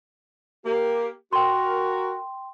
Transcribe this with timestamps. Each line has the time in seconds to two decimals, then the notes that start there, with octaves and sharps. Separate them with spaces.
0.65 A#3 G4
1.33 F#4 A#4 G5 C6